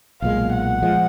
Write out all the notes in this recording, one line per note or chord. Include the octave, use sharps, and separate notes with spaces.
B1 A#2 G#3 F5
F#5
F3 G#3